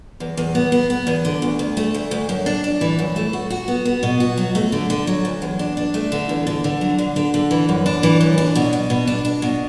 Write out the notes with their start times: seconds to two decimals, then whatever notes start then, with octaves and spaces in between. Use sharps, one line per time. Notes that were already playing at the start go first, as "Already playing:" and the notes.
0.20 E2
0.37 E2
0.55 B3
0.72 B3
0.90 B3
1.07 E2
1.25 D3
1.42 D2
1.59 D2
1.77 A3
1.94 D2
2.11 D2
2.29 F#2
2.46 D4
2.64 D4
2.81 E3
2.99 F#2
3.16 A3
3.33 F#4
3.50 F#4
3.68 B3
3.85 B3
4.03 B2
4.20 F#4
4.37 F#3
4.55 A3
4.72 D3
4.90 D3
5.07 F#3
5.25 D2
5.42 E2
5.59 D4
5.77 D4
5.94 A3
6.12 D3
6.29 E2
6.47 D3
6.64 D3
6.81 F#3
6.98 D3
7.16 D3
7.34 D3
7.51 E3
7.69 F#2
7.86 D4
8.03 E3
8.21 F#2
8.38 D4
8.55 B2
8.73 B2
8.90 B2
9.07 D4
9.25 D4
9.42 B2